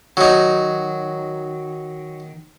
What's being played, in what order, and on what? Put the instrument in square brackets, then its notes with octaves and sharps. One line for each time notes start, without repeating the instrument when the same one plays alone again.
[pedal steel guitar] D#3 [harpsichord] F#3 D#4